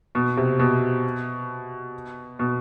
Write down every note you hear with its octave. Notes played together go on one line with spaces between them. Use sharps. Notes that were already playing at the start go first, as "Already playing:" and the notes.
B2
C3
B2
B2